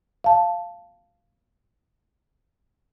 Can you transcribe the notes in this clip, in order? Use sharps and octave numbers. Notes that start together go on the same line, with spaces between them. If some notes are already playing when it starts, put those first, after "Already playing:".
F5 A5